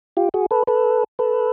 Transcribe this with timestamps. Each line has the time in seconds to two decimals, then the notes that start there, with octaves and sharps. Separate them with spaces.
0.17 F4 G4
0.34 F#4 G#4
0.51 A4 B4
0.67 A4 B4
1.19 A4 B4